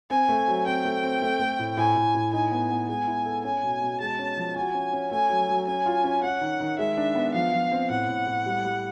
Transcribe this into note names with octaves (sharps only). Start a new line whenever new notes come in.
C4 G#5
A3
F#3
C4 G5
A3
C4
A3
A3
A2
A2 G#5
A2
A2
D#4 G#5
B3
B3
G#3 G#5
E4
A4
C#4 G#5
B2
B2
G#3 A5
C#4
F3
F#4 G#5
C#4
C#4
A3 G#5
F#3
F#3
C#4 G#5
F4
C#4
C#4 F#5
D#3
D#3
G#3 E5
D4
B3
F3 F5
F3
C4
A2 F#5
A2
A2
G3
G3